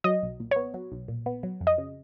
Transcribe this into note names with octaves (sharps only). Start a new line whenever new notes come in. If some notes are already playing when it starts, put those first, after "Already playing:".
F#3 D#5
B1
A#2
B3 C#5
F#3
B1
A#2
B3
F#3
F2
D#5
C#3